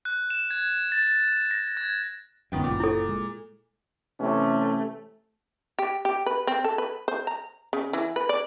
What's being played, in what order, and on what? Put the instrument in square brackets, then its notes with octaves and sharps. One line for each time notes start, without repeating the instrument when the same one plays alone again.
[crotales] F#6
E7
G#6
A6
A#6
G#6
[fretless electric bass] G1 C#2 F#2 [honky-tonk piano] D#3 B3 G5
[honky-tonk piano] A#2
[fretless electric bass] F#1 [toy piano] E4 A4
[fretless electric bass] G#3
[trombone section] C3 E3 C#4 [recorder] A3
[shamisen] G4
G4
B4
C4
A4
B4
C5
A#5
C#3
E3
B4
D5